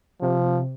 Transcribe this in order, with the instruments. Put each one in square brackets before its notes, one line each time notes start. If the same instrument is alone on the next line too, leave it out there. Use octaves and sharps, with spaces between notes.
[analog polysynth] C3 [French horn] F3